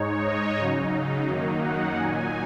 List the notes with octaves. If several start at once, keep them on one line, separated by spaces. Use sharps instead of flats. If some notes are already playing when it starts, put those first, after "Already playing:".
Already playing: G#2 G#3 D#4 C#5
D#5
C#3 F#3 D#4
F#2 D#3 F#3 A#3 D#4
F#5
A#2 F#3 D#4 G#5